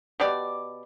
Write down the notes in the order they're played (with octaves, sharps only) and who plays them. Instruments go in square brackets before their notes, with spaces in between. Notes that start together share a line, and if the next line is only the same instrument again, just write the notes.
[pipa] B2 G4 D5